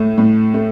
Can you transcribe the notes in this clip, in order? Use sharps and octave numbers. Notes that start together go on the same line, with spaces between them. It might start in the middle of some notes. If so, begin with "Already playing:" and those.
Already playing: A2 A3
A2
A3